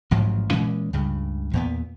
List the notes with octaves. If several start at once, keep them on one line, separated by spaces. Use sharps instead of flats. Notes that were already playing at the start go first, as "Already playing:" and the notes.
A1 G#2 F3 F#3
A#2 E3 G#3 C#4
C#2 G2 C#3
E2 A#2 B3